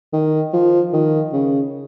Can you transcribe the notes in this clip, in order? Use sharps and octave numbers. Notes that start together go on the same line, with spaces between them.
D#3
F3
D#3
C#3